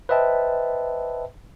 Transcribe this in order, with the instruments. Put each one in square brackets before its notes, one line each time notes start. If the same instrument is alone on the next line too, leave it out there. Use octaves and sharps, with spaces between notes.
[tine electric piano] B4 C5 D#5 E5 G5 A5